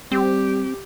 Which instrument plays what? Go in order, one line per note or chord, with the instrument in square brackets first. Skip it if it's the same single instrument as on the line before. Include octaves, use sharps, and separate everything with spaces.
[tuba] G3 [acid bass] C4 [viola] G4